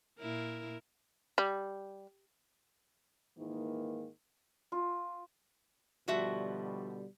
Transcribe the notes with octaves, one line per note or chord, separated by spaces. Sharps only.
A#2 E4 A#4
G3
G#2 D#3 E3 A#3
F4
B2 D3 F3 G3 F#4 E5